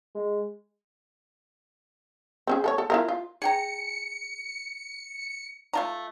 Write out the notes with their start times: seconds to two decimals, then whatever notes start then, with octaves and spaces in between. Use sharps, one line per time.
0.15 G#3
2.47 C4 C#4 G#4
2.64 A4 A#4 C#5
2.78 A4
2.90 E4 F4 A#4
3.09 F4
3.42 G#4 G5 A#5 C#7
5.73 A3 F4 A#5